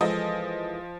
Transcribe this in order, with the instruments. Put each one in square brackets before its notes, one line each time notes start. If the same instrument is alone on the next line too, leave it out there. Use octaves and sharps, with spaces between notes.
[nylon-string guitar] E3 G#3 A4 [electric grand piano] F3 [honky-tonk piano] D#5